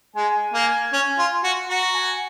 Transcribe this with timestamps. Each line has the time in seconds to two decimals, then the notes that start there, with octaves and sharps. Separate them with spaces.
0.16 G#3 G#5
0.54 A#3
0.93 C#4
1.18 F4
1.44 F#4
1.69 F#4 A#5
1.95 G#5